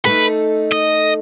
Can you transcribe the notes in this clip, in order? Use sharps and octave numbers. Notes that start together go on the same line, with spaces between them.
A3 D#4 A4 B4
D#5